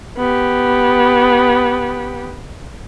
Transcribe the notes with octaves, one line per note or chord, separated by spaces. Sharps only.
B3 G4